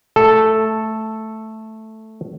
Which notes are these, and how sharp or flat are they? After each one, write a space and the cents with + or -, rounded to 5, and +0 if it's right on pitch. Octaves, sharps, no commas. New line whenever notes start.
A3 +0 A4 +0